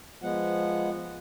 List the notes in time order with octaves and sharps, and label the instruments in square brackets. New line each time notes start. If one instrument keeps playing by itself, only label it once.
[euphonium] F3 [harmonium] G#3 B3 F#5